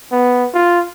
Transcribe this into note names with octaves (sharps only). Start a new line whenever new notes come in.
B3
F4